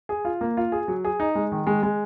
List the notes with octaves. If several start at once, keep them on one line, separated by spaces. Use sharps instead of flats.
G#4
F4
A#3
F4
G#4
F#3
G#4
D#4
G#3
D#3
G#3
G#3